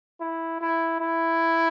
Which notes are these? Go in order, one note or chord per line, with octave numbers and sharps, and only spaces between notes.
E4
E4
E4